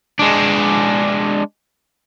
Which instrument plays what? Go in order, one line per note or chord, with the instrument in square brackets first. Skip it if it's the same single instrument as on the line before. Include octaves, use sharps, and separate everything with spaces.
[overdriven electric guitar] G#3 D4